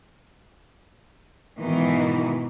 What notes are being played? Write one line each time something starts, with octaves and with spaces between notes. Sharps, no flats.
G#2 B2 D#3 E3